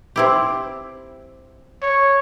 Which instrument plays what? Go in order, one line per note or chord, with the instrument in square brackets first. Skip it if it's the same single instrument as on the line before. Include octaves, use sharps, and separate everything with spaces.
[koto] C4 E4 G4
[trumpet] C#5